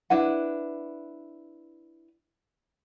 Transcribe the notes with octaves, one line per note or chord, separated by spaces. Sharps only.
D4 E4 B4 F#5